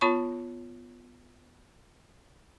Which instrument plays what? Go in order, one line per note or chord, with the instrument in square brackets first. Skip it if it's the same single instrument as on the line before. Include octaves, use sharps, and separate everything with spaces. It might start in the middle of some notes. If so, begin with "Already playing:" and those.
[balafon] B3 F4 C#5 A5 B5 C#6